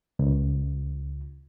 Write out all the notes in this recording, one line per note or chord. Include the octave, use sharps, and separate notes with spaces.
C#2